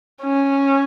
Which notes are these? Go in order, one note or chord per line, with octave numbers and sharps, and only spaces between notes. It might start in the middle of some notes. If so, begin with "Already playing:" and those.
C#4